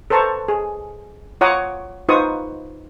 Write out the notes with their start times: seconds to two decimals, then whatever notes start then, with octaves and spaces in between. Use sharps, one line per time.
0.10 A4 B4 C5 A5 A#5 C#6
0.48 G#4
1.41 F4 C#5 F#5 A#5 D6 D#6
2.09 D#4 F4 B4 C5 C#6 D#6